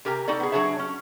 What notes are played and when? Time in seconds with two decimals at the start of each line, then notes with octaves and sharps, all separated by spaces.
0.05 C3 G4 A#4 G#5 A#5
0.28 D#4 F#4 A4 D5
0.40 B3 G#4
0.52 F#3 D4 F#4 G#4 C#5 E5
0.79 C#4